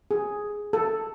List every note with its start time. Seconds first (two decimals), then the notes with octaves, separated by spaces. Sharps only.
0.11 G#4
0.73 A4